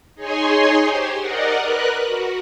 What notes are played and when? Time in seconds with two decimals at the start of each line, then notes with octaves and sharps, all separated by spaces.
0.15 D#4 G#4 C#5 G#5 C6
0.85 G4 C5
1.18 A#4 D5 D#5 F#5
1.60 A#4 B4 F#6
2.03 F#4